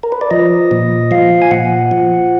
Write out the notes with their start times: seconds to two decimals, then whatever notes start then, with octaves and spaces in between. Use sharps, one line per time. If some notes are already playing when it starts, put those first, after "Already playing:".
0.03 A#4
0.12 B4
0.21 D5
0.31 F3 D#5
0.71 A#2
1.11 F3 F5
1.42 G#5
1.51 A#2 F#5
1.91 F3